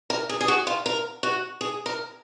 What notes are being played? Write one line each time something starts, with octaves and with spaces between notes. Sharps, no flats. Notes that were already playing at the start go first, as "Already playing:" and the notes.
A#4
G#4
G#4
F#4
F4
A#4
F#4
G#4
A#4